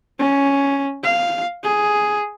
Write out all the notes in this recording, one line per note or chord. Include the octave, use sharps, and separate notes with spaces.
C#4
F5
G#4